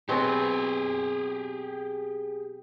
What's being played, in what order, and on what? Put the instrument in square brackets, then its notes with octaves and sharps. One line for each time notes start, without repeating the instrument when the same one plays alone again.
[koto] B2 F#3 C4 [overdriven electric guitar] G4 G#4